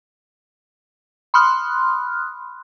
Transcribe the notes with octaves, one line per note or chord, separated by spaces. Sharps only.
B5 C6 D#6 F6 F#6